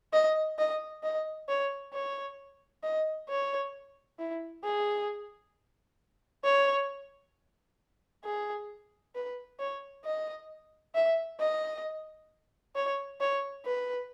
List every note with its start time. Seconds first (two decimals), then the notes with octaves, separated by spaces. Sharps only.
0.13 D#5
0.59 D#5
1.03 D#5
1.48 C#5
1.94 C#5
2.83 D#5
3.29 C#5
4.19 E4
4.64 G#4
6.44 C#5
8.25 G#4
9.15 B4
9.59 C#5
10.05 D#5
10.95 E5
11.40 D#5
12.75 C#5
13.20 C#5
13.65 B4